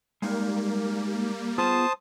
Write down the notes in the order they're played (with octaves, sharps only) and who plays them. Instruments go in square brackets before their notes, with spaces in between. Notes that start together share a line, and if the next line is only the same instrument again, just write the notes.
[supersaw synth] G3 A#3 [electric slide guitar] G#3 D#4 A#4
[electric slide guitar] B3 F4 G#4 [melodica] C5 A5 D#6